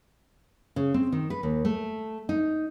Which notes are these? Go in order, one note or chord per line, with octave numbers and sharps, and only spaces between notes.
C#3
C4
D#3
B4
D#2
A3
D#4